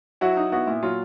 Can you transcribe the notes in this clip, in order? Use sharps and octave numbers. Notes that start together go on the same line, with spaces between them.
F#3 E4 F#4
D#4
B3 E4 F#4
A#2 E4
F#3 F4